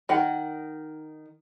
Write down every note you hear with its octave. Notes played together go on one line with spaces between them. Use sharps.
D#3 F#5